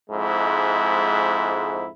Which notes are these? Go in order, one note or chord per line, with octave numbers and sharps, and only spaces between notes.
F2 G#2 G#3 E4